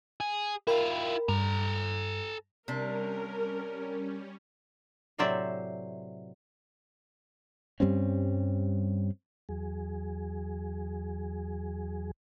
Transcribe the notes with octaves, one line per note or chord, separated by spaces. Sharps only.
G#4
E4 F4 A#4 G5 B5
G2 A4 A#5
C3 G3 C#4 D4 A#4
A2 C3 F#3 C5 D5 E5
G2 G3 C4 C#4
E2 F#3 G#4